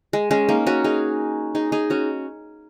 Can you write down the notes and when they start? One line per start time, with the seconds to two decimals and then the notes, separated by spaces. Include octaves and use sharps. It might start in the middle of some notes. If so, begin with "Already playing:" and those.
0.13 G#3
0.31 G#3 C#4
0.49 A#3 D#4
0.67 C#4 F#4
0.84 D#4 G#4
1.55 D#4 G#4
1.72 D#4 G#4
1.90 C#4 F#4